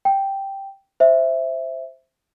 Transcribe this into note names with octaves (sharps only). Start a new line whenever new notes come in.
G5
C5 E5